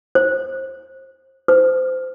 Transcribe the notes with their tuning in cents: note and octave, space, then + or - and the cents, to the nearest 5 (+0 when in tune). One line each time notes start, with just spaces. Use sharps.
C5 +25
C5 -20